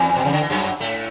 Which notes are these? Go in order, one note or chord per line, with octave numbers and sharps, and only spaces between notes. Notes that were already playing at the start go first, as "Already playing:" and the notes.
Already playing: E2 E3
B2
C#3
D3
E3
F#2 F#3
A2 A3